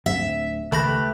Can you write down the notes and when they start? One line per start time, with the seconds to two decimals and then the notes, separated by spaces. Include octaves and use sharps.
0.06 D1 D2 C4 E5
0.72 C#2 D#3 A3 G4 B4 B5 A#6